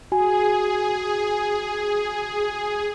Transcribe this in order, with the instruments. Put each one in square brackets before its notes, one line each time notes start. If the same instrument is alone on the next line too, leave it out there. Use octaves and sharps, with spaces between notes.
[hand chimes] F#4 G#5 [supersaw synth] G#4